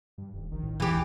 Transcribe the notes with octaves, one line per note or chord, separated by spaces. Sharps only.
G2
D#1
A#1 D#3
A2
A1 E2 E3 G4